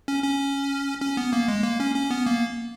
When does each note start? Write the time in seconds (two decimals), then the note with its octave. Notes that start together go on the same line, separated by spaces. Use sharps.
0.08 C#4
0.24 C#4
1.02 C#4
1.17 B3
1.33 A#3
1.48 G#3
1.64 A#3
1.80 C#4
1.95 C#4
2.11 B3
2.26 A#3